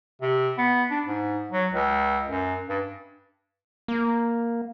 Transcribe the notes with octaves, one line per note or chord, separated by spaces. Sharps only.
C3
B3
D4
G#2
F#3
C#2
F#2
G2
A#3